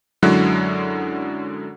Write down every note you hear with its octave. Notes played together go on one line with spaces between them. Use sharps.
F#2 D3 F#3 G#3 E4 F#6